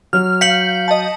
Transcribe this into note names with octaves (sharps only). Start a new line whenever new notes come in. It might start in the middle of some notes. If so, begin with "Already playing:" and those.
F#3 F6
F5 G6 B6 C#7 F#7
D#5 A5